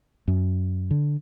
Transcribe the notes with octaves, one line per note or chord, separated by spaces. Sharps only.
F#2
D3